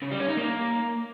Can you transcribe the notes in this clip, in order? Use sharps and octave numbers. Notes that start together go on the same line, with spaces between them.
C#3
G3
C#4
D#4
A#3